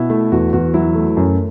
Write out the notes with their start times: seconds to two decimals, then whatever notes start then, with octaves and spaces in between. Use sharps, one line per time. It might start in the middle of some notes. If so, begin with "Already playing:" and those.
Already playing: B2 E4
0.10 A3
0.32 E2 F#4
0.53 E2 F#4
0.74 F#3 E4
0.95 A3
1.17 F#2